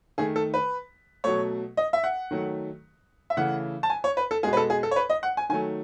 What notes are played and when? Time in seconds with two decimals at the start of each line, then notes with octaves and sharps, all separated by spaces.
0.18 D#3 A3 G#4
0.36 A4
0.54 B4
1.24 B2 F#3 A3 C#5
1.77 D#5
1.93 E5
2.04 F#5
2.31 D#3 F#3 A3
3.30 E5
3.37 C#3 E3 A3 F#5
3.83 A5
3.90 G#5
4.04 C#5
4.17 B4
4.31 A4
4.43 B2 G#3 G#4
4.53 B4
4.57 A4
4.70 G#4
4.83 A4
4.91 C#5
4.96 B4
5.10 D#5
5.23 F#5
5.37 G#5
5.49 D#3 F#3 A3 G#5